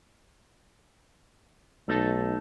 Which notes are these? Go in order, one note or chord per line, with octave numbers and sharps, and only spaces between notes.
B1 A3 D#4 A4